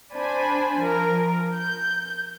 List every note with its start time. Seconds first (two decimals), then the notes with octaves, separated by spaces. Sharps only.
0.14 D4 C5 G#5 B5
0.80 F3 A#4
1.55 G6